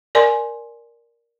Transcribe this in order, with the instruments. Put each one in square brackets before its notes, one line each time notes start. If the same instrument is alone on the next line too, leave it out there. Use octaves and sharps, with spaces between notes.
[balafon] A#4 D5 G#5 C6